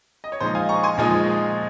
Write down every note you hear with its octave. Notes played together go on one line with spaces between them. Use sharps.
D#5
C#5
A#2 F3 G#3 D#4 C5
F5 G#5
A#5 C#6
G#5 C6
A#2 F3 G#3 D#4